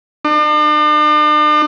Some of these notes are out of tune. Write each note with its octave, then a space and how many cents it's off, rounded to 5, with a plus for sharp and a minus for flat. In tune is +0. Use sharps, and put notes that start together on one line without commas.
D4 +45